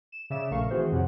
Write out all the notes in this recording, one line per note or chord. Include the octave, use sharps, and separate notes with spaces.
E7
C#3 D5 E5 E7
A#1 A3 A#4 F5 C#6
D#3 E3 C4 F#4 G#4 C5
F2 C3 C#5 F#5